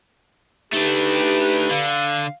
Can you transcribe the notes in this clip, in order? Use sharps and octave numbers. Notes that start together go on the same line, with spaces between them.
A3 D4 D#4 G4 B4
D3 F5